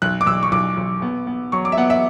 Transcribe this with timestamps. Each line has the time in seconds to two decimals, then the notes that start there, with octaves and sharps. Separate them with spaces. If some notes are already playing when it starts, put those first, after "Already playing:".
0.02 B1 F#6
0.21 D6
0.27 B1 E6
0.43 C#6
0.52 B1 D6
0.77 B1
1.02 B3
1.27 B3
1.52 F#3 C#6
1.65 D6
1.72 E5
1.77 B3 F#5
1.90 E5